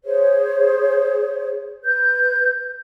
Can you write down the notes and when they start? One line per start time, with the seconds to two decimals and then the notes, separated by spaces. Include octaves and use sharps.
0.04 G#4 C5 C#5
1.84 B4 G6